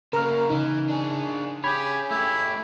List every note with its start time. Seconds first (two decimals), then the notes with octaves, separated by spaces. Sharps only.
0.13 C#3 A#3 A#4 A#5 F6
0.50 C#3 E3 D#4
0.89 D4 G#4
1.64 C#4 G4 G#4 B5 G#6
2.11 A3 E4 G4